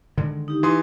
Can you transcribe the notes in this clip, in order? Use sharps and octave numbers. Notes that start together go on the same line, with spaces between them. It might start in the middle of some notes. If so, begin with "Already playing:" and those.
D3 D#3 G#3
D#4 G4
E3 C6 D#6